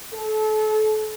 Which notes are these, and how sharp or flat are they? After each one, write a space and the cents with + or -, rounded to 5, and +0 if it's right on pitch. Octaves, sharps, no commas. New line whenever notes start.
A4 -30